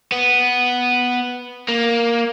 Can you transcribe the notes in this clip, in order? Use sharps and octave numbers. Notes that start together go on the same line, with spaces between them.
B3
A#3